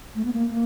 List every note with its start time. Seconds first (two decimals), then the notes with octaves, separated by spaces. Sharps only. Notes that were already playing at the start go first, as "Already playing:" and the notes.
0.15 A3
0.25 B3
0.33 A#3
0.51 A#3